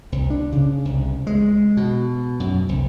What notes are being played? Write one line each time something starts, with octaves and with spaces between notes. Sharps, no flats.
C2
D4
C#3
C2
G#3
B2
F#2
C2